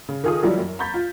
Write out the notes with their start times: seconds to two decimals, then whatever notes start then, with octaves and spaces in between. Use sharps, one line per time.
0.09 C#3
0.24 D#3 F4 G#4 A4 D#6
0.42 D#3 E3 F#3 G3 E4 F4
0.58 F#2
0.79 A#5 B5 C#6 G6 A6 B6
0.94 F4